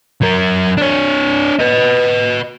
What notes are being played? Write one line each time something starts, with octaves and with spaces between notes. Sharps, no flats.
F#3 A#4
D4 C#5
B4 D#5